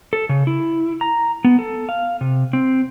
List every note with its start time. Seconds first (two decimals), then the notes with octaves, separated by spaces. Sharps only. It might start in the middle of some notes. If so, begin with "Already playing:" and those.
0.13 A4
0.29 C#3
0.47 E4
1.01 A#5
1.45 B3
1.59 A4
1.89 F5
2.21 C3
2.53 C4